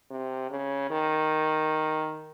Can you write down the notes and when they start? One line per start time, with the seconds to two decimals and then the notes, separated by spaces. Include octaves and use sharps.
0.10 C3
0.50 C#3
0.90 D#3